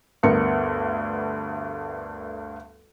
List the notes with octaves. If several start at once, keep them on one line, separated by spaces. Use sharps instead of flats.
D2 G2 B3 A#4 C#7